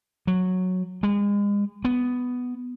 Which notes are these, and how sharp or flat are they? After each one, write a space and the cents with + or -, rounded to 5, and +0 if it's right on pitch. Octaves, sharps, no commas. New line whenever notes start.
F#3 -10
G#3 -35
B3 +5